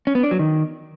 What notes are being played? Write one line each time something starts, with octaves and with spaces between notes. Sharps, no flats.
C#4
B3
D4
F#3
D#3